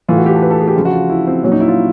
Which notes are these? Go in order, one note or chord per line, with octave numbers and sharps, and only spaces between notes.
A2 E3 F4
F#4
G4
A4
B4
A4
G#4
G4
C#3 F3 F4
F#4
F4
E4
C4
A#2 F#3 C#4
D#4
E4
F4